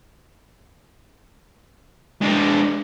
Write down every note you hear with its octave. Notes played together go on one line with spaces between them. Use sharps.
G#3 D4